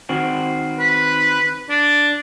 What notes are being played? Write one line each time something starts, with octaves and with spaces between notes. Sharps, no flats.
D#3 C4 F#4
B4
D4